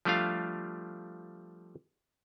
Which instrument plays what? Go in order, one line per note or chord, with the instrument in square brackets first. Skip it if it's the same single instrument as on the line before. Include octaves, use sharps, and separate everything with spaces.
[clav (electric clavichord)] F3 G3 A3 D4 F4 F5